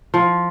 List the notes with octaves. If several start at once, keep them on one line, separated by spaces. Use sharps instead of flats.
F3